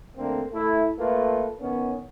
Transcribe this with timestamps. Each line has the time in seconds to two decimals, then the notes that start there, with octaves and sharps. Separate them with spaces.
0.17 D3 A3 A#3 C4
0.52 A3 E4
0.98 A3 A#3 F4 B4
1.60 D#3 B3 C#4